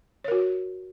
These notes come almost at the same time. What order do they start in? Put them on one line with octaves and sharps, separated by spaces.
C#5 A#4 F#4